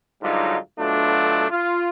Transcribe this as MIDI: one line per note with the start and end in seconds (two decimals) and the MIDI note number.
0.22 0.56 44
0.22 0.56 50
0.22 0.56 54
0.22 0.56 55
0.22 0.56 63
0.22 0.56 65
0.79 1.45 47
0.79 1.45 50
0.79 1.45 54
0.79 1.45 57
0.79 1.45 62
0.79 1.45 65
1.50 1.89 65